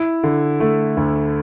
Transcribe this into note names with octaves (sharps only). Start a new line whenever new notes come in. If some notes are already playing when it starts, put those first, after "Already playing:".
Already playing: E4
D3
A3
D2